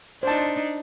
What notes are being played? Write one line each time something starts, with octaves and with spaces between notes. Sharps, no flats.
D4 D#4 C5 A5